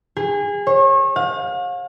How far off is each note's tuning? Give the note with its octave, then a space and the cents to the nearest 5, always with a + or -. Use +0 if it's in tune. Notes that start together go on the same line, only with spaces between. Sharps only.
G#4 -30
C#5 -35
F5 +40